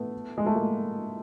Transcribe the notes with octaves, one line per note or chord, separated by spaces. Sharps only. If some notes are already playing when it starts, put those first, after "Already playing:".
Already playing: A3 B3
G#3
A3
G#3 A#3